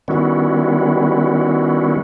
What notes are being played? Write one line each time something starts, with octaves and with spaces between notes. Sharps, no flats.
D#3 G3 B3 C#4 E4 F#4